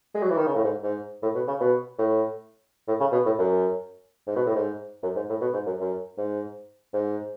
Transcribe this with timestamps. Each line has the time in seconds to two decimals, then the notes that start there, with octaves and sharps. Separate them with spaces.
0.15 G#3
0.23 F#3
0.30 E3
0.38 D#3
0.46 C#3
0.56 A2
0.64 G#2
0.83 G#2
1.23 A2
1.35 B2
1.48 C#3
1.61 B2
1.99 A2
2.88 A2
3.00 C#3
3.12 B2
3.26 A2
3.39 F#2
4.27 G#2
4.36 B2
4.46 A2
4.55 G#2
5.03 F#2
5.16 G#2
5.29 A2
5.41 B2
5.54 G#2
5.66 F#2
5.80 F#2
6.18 G#2
6.94 G#2